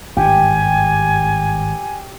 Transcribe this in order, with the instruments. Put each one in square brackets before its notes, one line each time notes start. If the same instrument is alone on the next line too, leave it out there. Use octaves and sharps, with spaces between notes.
[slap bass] G#1 G2 [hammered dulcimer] G4 [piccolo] G#5